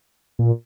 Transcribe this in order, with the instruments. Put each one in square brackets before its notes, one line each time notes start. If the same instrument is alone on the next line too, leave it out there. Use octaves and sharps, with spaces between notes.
[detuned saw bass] A#2